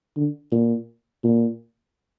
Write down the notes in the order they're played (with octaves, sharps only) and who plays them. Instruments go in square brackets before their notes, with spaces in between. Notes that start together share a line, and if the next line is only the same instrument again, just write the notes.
[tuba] D3
A#2
A#2